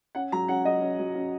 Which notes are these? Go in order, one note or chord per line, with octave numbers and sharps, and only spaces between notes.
C#4 F#5
F#3 A#5
C#4 F#5
F#3 D#5
C#4
F#3
C#4